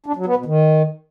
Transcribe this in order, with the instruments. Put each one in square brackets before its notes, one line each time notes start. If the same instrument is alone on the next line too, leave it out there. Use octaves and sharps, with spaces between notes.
[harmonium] D4
F#3
B3
B2
D#3